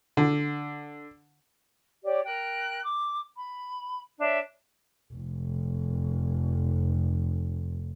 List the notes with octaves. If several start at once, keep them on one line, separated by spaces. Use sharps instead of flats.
D3
G4 C#5 D5
A#4 G5 F#6
D6
B5
D4 C#5 E5
F1 F2